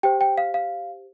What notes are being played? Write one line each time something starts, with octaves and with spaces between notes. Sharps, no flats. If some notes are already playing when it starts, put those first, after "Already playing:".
G4 C5 G5
G5
F5
F5